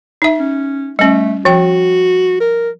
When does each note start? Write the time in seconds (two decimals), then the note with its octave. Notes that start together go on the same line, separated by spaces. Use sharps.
0.22 D#4 E5
0.40 C#4
0.99 G3 A3 C#4
1.45 F3 F#4 G5
2.41 A#4